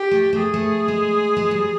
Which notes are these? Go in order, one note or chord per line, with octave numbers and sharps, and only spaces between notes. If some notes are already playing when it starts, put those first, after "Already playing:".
Already playing: G4
A3
A3
G#4
A3
G#3
G#3
G3